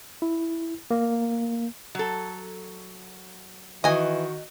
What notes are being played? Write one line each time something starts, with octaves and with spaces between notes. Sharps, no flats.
E4
A#3
F#3 A4
D#3 E3 F#4 D#5 G#5